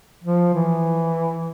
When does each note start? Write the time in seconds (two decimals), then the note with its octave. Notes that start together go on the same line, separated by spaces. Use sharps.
0.24 F3
0.54 E3